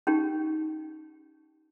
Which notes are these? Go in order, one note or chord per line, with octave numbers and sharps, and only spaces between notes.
C#4 D#4 G4